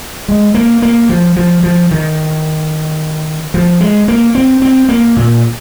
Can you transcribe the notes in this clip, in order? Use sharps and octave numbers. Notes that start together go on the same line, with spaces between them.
G#3
A#3
A#3
F3
F3
F3
D#3
F3
G#3
A#3
C4
C4
A#3
A#2